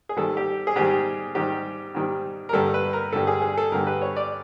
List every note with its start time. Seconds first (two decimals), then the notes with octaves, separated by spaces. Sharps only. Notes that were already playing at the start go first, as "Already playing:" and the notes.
0.09 G#4
0.17 G#2 D#3 G3 A4
0.37 G4
0.67 G#4
0.76 G#2 D#3 G3 G4
1.35 G#2 D#3 G3 G4
1.95 G#2 D#3 G3
2.49 A#4
2.53 G2 D3 G3 A4
2.74 B4
2.93 A#4
3.13 G2 D3 G3 A4
3.27 G#4
3.42 G#4
3.58 A4
3.72 G2 D3 G3 A#4
3.87 B4
4.02 C#5
4.16 D5